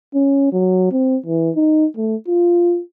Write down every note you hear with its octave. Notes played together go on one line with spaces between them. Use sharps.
C#4
F#3
C4
E3
D#4
A3
F4